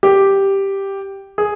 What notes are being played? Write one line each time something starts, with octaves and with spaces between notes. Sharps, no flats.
G4
G#4